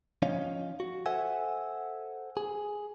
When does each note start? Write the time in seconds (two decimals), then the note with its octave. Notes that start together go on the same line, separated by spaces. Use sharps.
0.22 F3 C#4 D#4 C#5 F5
0.80 F#4
1.06 A4 C5 E5 F#5 G#5
2.37 G#4